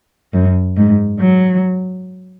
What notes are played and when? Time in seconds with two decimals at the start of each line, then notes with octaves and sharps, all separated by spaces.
0.33 F#2
0.77 G#2
1.20 F#3